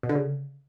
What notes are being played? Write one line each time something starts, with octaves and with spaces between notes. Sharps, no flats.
B2
D3
C#3